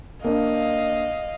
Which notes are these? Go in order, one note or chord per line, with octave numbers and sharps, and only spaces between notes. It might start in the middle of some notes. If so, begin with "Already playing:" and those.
A#3 D4 D#5 F5